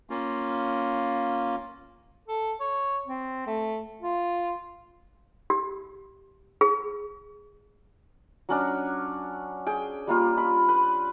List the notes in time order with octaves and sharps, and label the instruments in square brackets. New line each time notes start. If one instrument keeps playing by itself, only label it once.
[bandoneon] A#3 C#4 F4
[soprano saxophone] A4
C#5
C4
A3
F4
[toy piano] G4
G#4
[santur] F#3 C#4 D4
G#4 G5
G3 A#3 F4
B5
B4